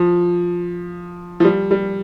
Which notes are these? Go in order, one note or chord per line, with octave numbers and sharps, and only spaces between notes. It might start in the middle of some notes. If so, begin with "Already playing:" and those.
Already playing: F3
F3
G3
G3